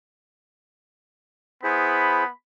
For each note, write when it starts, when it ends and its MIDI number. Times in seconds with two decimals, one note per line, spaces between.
1.64 2.28 59
1.64 2.24 64
1.64 2.24 68
1.64 2.24 72
1.64 2.30 83